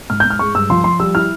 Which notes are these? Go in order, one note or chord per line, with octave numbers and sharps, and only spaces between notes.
G#2 F6
G6
G#2
F6
G#3 C#6
G2 E6
F3 C6
F3 C6
G3 E6
E4 F6